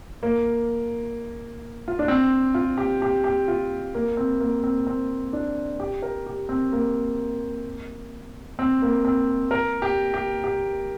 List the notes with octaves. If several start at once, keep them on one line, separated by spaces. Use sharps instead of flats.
A#3
F4
D4
C4
F4
G4
G4
G4
F4
A#3
C4
A#3
C4
C4
D4
G4
A#4
G4
C4
A#3
C4
A#3
C4
A#4
G4
G4
G4